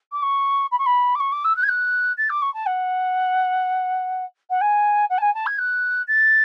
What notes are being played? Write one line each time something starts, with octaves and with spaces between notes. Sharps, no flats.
D6
C#6
B5
C#6
B5
D6
C#6
D6
E6
F#6
G#6
F#6
A6
D6
C#6
A5
F#5
F#5
G#5
F#5
A5
G#5
A5
G#6
F#6
A6